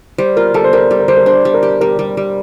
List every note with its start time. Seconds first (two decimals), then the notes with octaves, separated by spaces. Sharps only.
0.18 G3 C5
0.37 F4 A#4
0.54 G3 A4
0.64 C5
0.73 G3 A#4
0.91 G3
0.99 A#4
1.08 G3 C5
1.17 A#4
1.26 D4 C5
1.45 G3
1.54 A#4
1.63 G4
1.81 G3 A#4
1.99 G3
2.17 G3